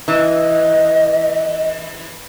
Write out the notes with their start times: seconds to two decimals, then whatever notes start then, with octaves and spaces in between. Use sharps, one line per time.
0.08 E3 D#5